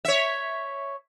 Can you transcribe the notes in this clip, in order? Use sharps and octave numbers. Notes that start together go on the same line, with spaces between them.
C#5 E5